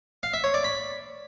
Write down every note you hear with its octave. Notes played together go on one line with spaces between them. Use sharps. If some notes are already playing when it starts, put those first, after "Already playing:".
F5
E5
C#5
D5
B5